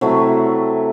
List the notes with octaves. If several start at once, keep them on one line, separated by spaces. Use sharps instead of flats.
C3 F#3 A3 E4